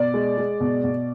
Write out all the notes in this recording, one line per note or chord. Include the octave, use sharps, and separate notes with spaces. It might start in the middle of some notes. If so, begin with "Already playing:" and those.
Already playing: B2 D5
G#3
G#3
B2
B2